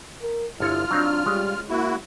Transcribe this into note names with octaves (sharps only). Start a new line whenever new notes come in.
A#4
G1 E4 F4 A4 C#5 F6
F#3 C4 D4 D#4
G3 G#3 C#4
A#3 E4 F#4